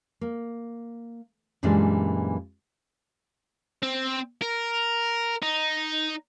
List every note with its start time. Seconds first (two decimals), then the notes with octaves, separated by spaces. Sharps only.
0.21 A#3
1.63 F#2 A#2 E3 G3 G#3 D4
3.83 C4
4.42 A#4
5.42 D#4